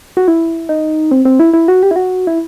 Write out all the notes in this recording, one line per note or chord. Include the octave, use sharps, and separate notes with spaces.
F#4
E4
D#4
C4
C4
E4
E4
F#4
G4
E4
F#4
E4